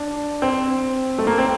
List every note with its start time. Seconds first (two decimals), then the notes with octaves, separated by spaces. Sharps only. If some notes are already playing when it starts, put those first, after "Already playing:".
Already playing: D4
0.42 C4
1.18 A3
1.27 A#3
1.38 C4